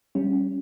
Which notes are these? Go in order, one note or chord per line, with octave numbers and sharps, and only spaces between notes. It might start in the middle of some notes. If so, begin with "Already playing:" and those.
G3 C#4